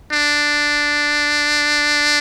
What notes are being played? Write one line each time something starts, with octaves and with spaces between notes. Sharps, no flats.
D4